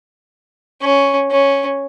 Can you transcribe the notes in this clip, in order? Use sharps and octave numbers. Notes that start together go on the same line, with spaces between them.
C#4
C#4